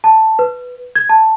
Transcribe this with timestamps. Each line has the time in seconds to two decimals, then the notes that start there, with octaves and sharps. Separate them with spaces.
0.04 A5
0.39 B4
0.95 G#6
1.09 A5